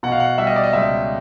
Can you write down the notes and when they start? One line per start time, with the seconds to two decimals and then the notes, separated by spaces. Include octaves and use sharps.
0.03 B2 F#5
0.12 F5
0.20 F#5
0.38 G3 E5
0.47 D#5
0.56 D5
0.63 D#5
0.73 C#2 E5